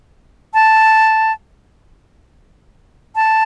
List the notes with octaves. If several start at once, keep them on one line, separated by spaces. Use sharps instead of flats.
A5
A5